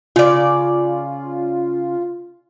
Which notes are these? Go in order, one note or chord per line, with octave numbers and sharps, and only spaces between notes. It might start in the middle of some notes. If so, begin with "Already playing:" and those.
C#3 F4 D5